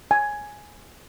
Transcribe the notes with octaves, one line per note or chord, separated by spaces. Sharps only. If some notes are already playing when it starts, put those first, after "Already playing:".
G#5